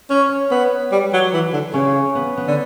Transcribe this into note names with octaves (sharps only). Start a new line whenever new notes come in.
C#4 C#5
C#5
B3 B4
G3
F#3
E3
D3
C#3 C#4
B3
B3
D3